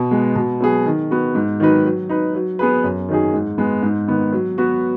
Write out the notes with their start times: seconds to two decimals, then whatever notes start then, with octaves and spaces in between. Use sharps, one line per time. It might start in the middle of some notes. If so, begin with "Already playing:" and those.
Already playing: B2
0.11 G#3 B3
0.36 B2
0.61 F#3 B3 G#4
0.86 D#3
1.11 B3 F#4
1.35 G#2
1.60 D#3 F#3 D#4 B4
1.85 F#3
2.09 D#4 B4
2.35 F#3
2.59 B3 G#4 B4
2.84 F#2
3.09 D#3 F#3 D#4 G#4
3.33 G#2
3.58 G#3 B3
3.83 G#2
4.08 D#3 B3
4.33 F#3
4.58 B3 F#4 B4